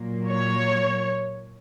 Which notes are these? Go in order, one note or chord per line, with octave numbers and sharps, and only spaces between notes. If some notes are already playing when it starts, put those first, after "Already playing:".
Already playing: A#2 F#3 A#3
C#5